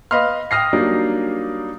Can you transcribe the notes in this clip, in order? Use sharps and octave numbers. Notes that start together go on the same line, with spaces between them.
B4 D#5 F5 B5 C6 F6
G5 D#6 F6 A#6 C7
F#3 G3 A#3 D4 D#4